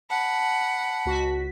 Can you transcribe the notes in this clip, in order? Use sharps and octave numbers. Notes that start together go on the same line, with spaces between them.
F#5 A5 B5
C#2 F#4 B6